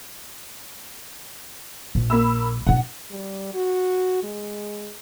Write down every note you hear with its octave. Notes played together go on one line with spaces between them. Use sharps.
A#1
A#3 B5 E6
B2 D4 F#5
G3
F#4
G#3